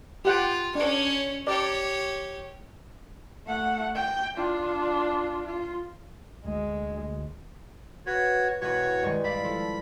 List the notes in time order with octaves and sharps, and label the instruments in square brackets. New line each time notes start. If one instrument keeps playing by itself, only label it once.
[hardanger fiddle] F4 [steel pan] G4 F#5 G5
[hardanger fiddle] C#4 C#5 [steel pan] D4
[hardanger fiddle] G4 C#5 [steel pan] D5
[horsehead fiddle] A3 F#5
G5
D4 F4
F4
[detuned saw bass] D2 [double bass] G#3
[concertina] F#4 C#5 [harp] B4
[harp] E1 B4 [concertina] F#4 C#5 C#6
[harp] G2 D#3 G#3
[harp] E4 D5 F5 [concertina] B5
[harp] F3 A4